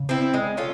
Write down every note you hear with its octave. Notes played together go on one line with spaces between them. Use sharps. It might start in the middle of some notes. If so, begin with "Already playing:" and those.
Already playing: C#3
C4 E4
G#3
C#4 F4 A4